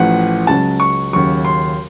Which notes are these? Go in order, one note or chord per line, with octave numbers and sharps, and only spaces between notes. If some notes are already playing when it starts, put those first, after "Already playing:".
Already playing: A1 A2 F3 F#5
C#2 C#3 F#3 A5
C#6
D#2 C#3 F#3 C#6
C6